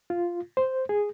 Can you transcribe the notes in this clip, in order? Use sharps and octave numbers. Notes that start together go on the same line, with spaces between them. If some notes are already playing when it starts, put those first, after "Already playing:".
F4
C5
G#4